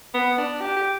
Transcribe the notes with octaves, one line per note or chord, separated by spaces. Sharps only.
B3
D4
G4
G4